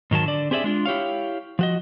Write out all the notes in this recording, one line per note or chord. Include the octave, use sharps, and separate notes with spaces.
G#2 D#3 F#3 A5
D3 D5
C4 G4 G#4 D5 E5
G#3 D4 F4
E4 G4 C#5 F5
F3 F#4 D#5